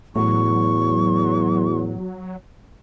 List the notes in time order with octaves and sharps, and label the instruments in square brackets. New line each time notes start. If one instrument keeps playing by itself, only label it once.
[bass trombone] E2 [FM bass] A2 [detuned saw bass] F#3 [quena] C#6